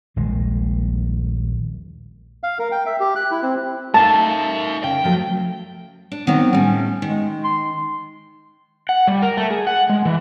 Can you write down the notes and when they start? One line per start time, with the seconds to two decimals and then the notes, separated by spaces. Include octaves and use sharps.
0.16 D#1 A#1 D#3 G#3
2.43 F5
2.59 A#4
2.72 G5
2.86 E5
3.00 G4
3.16 F#6
3.31 E4
3.42 C4
3.94 A3 D#4 A#4 E5 F5 A5
4.84 C#3 G5
5.04 F3 F#3 A3
6.12 D4
6.27 D#3 F#3 B3 C4
6.53 A2 G3 C#4
7.02 D#3 G#3
7.44 C6
8.89 F#5
9.07 G3
9.22 A#4
9.37 A3
9.51 G#4
9.67 F#5
9.89 G#3
10.05 E3